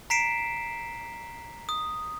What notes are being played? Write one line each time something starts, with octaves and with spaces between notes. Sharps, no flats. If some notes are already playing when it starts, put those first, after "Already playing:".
A#5 B6 C7 D7 E7
D#6